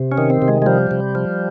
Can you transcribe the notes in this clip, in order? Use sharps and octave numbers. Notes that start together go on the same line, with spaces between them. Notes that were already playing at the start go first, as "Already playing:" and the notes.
Already playing: C3
C#4
D#3
C4
C3
G#3
G#3
F3 G3
C3
F3